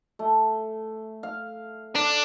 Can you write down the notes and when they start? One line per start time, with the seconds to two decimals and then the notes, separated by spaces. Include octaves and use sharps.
0.19 A3
1.23 F5
1.95 D4